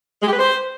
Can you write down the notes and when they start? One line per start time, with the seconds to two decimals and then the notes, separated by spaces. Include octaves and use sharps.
0.21 G#3
0.27 G4
0.32 B4
0.38 C5